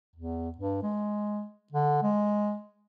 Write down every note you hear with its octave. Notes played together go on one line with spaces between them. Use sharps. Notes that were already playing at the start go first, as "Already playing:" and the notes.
E2
G2
G#3
D3
G#3